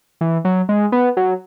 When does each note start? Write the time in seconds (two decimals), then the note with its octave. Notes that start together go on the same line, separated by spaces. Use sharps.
0.21 E3
0.45 F#3
0.69 G#3
0.92 B3
1.17 F#3